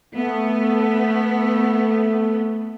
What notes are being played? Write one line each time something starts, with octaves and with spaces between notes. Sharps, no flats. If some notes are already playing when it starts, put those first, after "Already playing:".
A3 B3